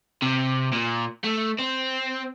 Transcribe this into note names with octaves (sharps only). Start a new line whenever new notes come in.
C3
A#2
A3
C4